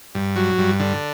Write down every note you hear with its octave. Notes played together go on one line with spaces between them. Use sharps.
G2
F#3
G2
D3